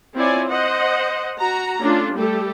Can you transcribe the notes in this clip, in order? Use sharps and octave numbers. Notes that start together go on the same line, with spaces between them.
C4 E4 F4 C#5 D5 G#5
C5 D#5 F#5
F#4 A#5
A3 C#4 D4 F4
G3 A3 G4 A4